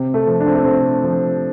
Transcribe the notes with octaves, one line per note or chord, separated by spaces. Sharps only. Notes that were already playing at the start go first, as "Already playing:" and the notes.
Already playing: C3
A3
F3
D4
C4
A3
C3 C4
F3